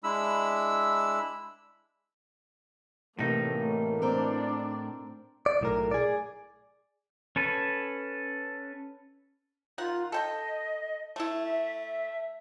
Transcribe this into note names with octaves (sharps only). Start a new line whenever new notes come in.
G#3 D4 E4 B5 E6
A2 C3 E3 A3 A#3 C#4 D#4
C4 D4 A#4 D5
D5
B1 A2 A#4
G#4 D5
C#4 A4 B4
D#3 F4 F#5
A4 D#5 G5
A3 E4
E5